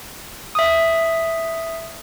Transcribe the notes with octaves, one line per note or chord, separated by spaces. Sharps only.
E5 D#6